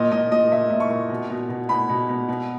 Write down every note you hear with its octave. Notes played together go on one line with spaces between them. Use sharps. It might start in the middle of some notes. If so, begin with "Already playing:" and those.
Already playing: A#2 D#5
A#2 D#5
A#2 D#5
A#2 E5
A#2
C#6
A#2
B2
B2
B2
B2 B5
B2
B2
B2